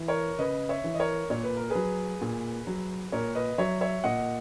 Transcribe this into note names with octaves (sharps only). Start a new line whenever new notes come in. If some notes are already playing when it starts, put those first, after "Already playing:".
Already playing: E3
A#4 C#5
C#3 B4 D#5
C#5 E5
E3
D#5
A#4 C#5
A#2 C#5
B4
A#4
G#4 B4
F#3
A#2
F#3
A#2 A#4 C#5
B4 D#5
F#3 C#5 E5
C#5 E5
A#2 D#5 F#5